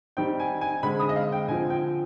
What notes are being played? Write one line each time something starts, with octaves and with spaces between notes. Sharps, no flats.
D#3 G3 C4 G5
G#5
G#5
D3 G#3 C4 B5
D#6
D#5
F5
G5
D3 F3 C4 G#5
G5